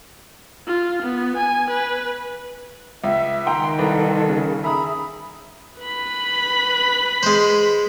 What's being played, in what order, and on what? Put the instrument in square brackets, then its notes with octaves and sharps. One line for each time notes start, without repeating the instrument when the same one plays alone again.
[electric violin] F4
B3
G#5
B4
[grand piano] C#2 [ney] E5
[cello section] D#3 [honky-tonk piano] F#5 G5 A#5 [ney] C6
[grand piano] C2 B4 [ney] A4
[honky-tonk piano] C#3
[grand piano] G#4 [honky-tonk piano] E5 A#5 D#6 [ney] B5
[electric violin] B4 B5
[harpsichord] G#3 C5